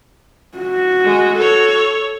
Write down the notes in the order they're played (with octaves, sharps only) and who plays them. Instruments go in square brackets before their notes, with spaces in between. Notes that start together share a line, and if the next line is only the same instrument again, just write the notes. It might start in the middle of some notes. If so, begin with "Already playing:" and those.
[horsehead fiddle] F#4
[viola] G#3
A4 C#5